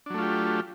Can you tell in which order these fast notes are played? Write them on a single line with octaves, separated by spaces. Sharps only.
D4 F#3 A3 F4 G4